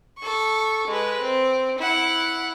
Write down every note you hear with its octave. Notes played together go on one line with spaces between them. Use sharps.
A4 C#6
G#3 B4
C4
E4 F#5